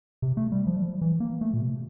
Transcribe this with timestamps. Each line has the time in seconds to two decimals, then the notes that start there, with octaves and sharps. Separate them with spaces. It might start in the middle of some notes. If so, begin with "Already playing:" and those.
0.22 C3
0.37 A3
0.52 G3
0.67 F3
0.77 G3
0.82 F3
1.01 E3
1.20 A#3
1.41 A3
1.54 A#2
1.61 C3